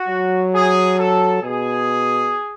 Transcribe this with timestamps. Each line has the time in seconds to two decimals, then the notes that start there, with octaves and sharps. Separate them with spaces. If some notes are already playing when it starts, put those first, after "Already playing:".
Already playing: F#4
0.08 F#3
0.54 G#4
0.99 A4
1.43 B2 G#4